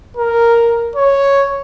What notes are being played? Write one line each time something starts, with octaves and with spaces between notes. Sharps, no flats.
A#4
C#5